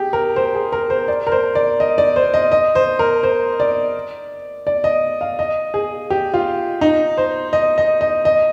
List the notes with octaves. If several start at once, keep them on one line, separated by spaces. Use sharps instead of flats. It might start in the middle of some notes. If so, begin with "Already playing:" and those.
Already playing: G4 G#4
A#4
C5
G#4
A#4
C5
D5
A#4
C5
D5
D#5
D5
C5
D#5
D#5
C5
A#4
C5
D5
D5
D#5
F5
D#5
G#4
G4
F4
D#4
C5
D#5
D#5
D#5
D#5